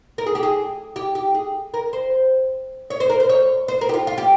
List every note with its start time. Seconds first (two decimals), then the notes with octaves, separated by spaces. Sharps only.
0.18 A#4
0.26 G#4
0.35 G4
0.43 G#4
0.96 G4
1.15 G4
1.35 G#4
1.74 A#4
1.93 C5
2.90 C#5
3.00 C5
3.10 A#4
3.20 C5
3.29 C#5
3.68 C5
3.81 A#4
3.89 G4
3.94 F4
4.07 F4
4.18 G4